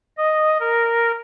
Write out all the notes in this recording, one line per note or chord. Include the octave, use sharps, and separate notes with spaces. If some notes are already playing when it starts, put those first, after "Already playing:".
D#5
A#4